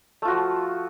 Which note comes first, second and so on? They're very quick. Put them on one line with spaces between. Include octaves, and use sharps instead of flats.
A3 F4 F#4 F3